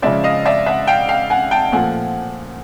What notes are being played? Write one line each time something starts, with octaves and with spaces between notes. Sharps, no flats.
C#3 F3 G#3 D5 E5
D#5 F5
D5 E5
E5 F#5
F5 G5
F5 G5
F#5 G#5
G5 A5
A#2 F3 A3 F#5 G#5